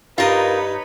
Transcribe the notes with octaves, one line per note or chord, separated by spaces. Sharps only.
G2 G3 D#4 F4 A#4 B4 C#5 D#5